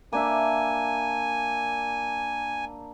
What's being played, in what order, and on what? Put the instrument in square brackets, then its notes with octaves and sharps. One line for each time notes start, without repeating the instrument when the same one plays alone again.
[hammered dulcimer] A#3 D4 E5 [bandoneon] G#5